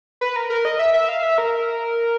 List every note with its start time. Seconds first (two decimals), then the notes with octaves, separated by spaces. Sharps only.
0.21 B4
0.36 A#4
0.50 A#4
0.65 D#5
0.79 E5
0.94 E5
1.09 F5
1.23 E5
1.38 A#4